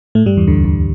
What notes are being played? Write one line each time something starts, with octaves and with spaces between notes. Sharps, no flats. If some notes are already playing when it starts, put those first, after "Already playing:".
A2 A3
G2 G3
E2 E3
D2 D3
D2 D3